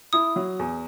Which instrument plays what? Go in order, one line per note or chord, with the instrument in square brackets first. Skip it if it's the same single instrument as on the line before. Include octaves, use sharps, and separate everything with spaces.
[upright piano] E4 [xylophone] D#6
[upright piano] F#3
E2